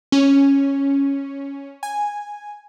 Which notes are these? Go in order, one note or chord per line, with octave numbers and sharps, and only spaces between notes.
C#4
G#5